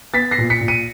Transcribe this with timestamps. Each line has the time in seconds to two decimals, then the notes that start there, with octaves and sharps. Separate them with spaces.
0.14 B3 A6 B6
0.31 A#6 C7
0.38 A#2
0.50 B6 C#7
0.61 A#2
0.68 C#7 D#7